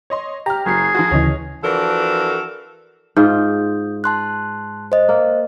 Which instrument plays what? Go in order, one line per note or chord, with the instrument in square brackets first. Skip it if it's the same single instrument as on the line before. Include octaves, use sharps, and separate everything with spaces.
[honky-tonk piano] C#5 D#5 C6
[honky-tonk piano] G4 F6 [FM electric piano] A#5
[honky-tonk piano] F#1 F#3 C7 [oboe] G#4
[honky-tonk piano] F3 F4 F#4
[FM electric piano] D2 C#3 E3 [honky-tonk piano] C#5 D#5
[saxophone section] E3 F3 D4 F#4 A4 A#4
[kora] G#2 F4 [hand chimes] D#6 G6
[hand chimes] A5 C6 F#6
C5 D#5
[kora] A#3